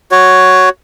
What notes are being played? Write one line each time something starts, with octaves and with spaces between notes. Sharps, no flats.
F#4 C#5